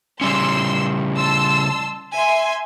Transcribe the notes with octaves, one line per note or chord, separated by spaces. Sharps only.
C#3 G3 C#4 C6 E6
A5 C6 E6
E5 G#5 C6